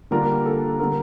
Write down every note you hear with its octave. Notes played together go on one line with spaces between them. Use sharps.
D3 G3 A#3 D4 F4 A#4
A4
D3 G3 A#4